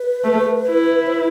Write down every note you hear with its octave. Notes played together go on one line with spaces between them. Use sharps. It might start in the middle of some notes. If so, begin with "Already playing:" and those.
Already playing: B4
A3
E4
C5
B4